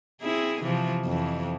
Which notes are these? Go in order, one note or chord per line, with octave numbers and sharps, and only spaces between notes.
C4 E4 G#4
C3 E3 F3
F2 E3